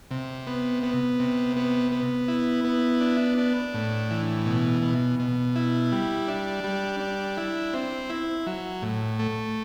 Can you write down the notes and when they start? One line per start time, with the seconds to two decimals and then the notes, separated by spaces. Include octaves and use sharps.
0.11 C3
0.47 B3
0.83 B3
1.19 C3
1.57 B3
1.92 B3
2.28 E4
2.64 B3
3.01 D4
3.38 D4
3.74 A2
4.11 E3
4.46 B2
4.82 B2
5.20 B2
5.56 E4
5.92 G3
6.28 D4
6.64 G3
7.00 D4
7.37 E4
7.74 C4
8.09 E4
8.47 F#3
8.82 A2
9.19 A3